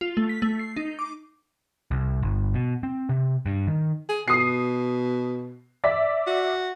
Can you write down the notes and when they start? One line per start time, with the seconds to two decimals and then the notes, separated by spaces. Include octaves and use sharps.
0.01 F4
0.17 A3
0.29 B6
0.42 A3
0.59 C7
0.76 D#4
0.99 D6
1.91 C2
2.22 G1
2.54 B2
2.83 C4
3.09 C3
3.46 G2
3.67 D#3
4.09 G#4
4.28 B2 D#6 C7
5.84 D5 E5 B6
6.27 F#4